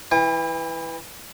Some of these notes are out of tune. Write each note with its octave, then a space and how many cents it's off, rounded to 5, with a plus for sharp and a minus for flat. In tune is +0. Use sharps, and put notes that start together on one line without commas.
E3 +0 G5 +45